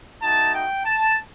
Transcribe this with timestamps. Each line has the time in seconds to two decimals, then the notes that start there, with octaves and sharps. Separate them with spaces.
0.23 A3 D#4 F#4 A5
0.54 G5
0.85 A5